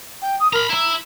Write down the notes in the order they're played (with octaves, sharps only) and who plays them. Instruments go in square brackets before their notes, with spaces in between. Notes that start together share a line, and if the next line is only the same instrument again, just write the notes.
[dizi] G5
D#6
[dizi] A#4 [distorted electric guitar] A#5 B5
[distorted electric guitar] E4 E5 [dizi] A#5